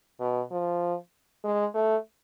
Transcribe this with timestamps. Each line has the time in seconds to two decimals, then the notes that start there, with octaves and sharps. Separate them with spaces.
0.20 B2
0.51 F3
1.44 G#3
1.74 A3